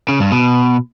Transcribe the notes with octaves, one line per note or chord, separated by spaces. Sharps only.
C#3
G2
B2